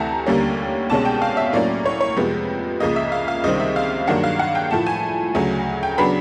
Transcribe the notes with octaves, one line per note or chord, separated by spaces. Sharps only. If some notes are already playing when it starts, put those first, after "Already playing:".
Already playing: D2 C3 E3 A3 A5 A#5
D#2 D3 G3 A#3 C#4
C2 B2 G#3 C#4 A5
G5
F5
E5
A2 F#3 A#3 C#4 D5
C#5
C#5
F2 C3 F3 G#3 B3
C#2 C#3 F3 A#3 D#5
E5
F5
F5
C#2 C3 D#3 G3 C4 D#5
E5
F5
G2 D#3 F#3 A#3 D4 F#5
F5
F#5
G5
A2 F3 A3 A5
G#5
D2 C#3 F#3
G5
C#3 F#3 B3 D4 B5